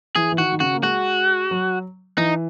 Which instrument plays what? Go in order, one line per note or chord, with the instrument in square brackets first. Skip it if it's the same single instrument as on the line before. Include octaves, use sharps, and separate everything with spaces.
[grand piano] E3 [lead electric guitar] G#4
[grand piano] E3
[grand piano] D#3 [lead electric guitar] F#4
[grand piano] D#3
[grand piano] C#3 [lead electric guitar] F#4
[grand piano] A#3
[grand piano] G#3 [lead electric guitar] F#4
[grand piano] F#3
[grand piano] E3 [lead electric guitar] D#4